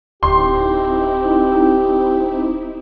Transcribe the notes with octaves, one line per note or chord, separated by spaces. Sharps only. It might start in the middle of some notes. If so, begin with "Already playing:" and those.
D1 C4 D#4 E4 G4 C6